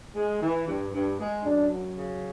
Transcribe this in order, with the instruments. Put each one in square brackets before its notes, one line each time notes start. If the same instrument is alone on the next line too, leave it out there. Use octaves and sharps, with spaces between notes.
[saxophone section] G#3
E3
G2
G2
G#3
[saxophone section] F#2 [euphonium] D4
[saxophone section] F#3
C#3